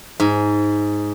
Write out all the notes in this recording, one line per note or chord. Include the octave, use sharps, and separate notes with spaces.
G#2